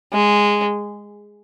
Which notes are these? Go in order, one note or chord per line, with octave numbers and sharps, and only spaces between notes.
G#3